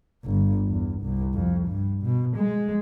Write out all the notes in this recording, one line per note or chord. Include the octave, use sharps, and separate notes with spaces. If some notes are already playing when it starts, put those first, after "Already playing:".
G1
E2
C2
F2
G2
B2
G#3